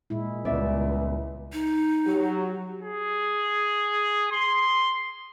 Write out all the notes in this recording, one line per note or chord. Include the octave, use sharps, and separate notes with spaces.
A#2 G#3 E4
C#2 G3 B3 C#4 D5 E5
D#4
F#3 G4
G#4
C6